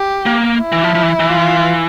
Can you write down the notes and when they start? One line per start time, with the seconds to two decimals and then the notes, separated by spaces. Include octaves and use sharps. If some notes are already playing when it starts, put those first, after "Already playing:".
Already playing: G4
0.26 A#3
0.60 E4
0.72 E3
0.84 F3
0.95 F3
1.03 E3
1.20 E3
1.30 F4